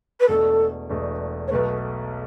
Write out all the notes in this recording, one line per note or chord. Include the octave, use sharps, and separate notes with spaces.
B4
E1 E2 B2 A3 D4 A4
E1 E2 B2 A3 D4
C#5
B1 B2 A3 B4